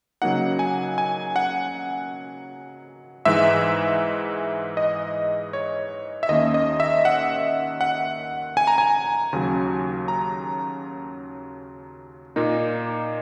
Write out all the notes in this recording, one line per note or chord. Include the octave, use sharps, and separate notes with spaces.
C#3 F#3 A#3 D#4 F#5
G#5
G#5
F#5
G#2 E3 G#3 E5
D#5
C#5
E5
D#2 D#3 A#3 C#4 D#5
D#5
E5
F#5
F#5
G#5
A#5
G#5
D#2 C#3 F#3
A#5
A#2 A#3 D#4